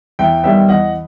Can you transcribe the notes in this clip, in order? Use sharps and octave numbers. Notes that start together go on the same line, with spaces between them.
E2 E5 G5
D#3 G3 B3 E5 G5
E2 D#5 F#5